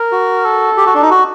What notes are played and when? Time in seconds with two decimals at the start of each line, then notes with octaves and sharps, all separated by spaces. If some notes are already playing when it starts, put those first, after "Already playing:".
Already playing: A#4
0.12 F#4
0.45 A4
0.77 G4
0.86 F#4
0.94 D4
1.02 D#4
1.10 F#4